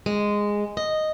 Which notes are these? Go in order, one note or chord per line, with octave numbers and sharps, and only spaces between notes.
G#3
D#5